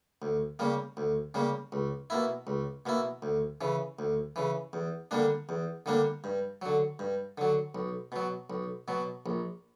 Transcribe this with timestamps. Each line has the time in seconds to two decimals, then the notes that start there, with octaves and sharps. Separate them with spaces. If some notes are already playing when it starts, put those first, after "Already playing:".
0.22 D2
0.59 C#3 G3 A#3
0.97 D2
1.34 C#3 G3 A#3
1.72 C#2
2.10 B2 A#3 E4
2.47 C#2
2.86 B2 A#3 E4
3.22 D2
3.61 C#3 E3
3.99 D2
4.36 C#3 E3
4.73 E2
5.11 D3 G3 A#3 D4
5.49 E2
5.86 D3 G3 A#3 D4
6.24 G2
6.62 D3 F#3
6.99 G2
7.38 D3 F#3
7.75 B1
8.12 B2 F#3
8.50 B1
8.88 B2 F#3
9.26 A#1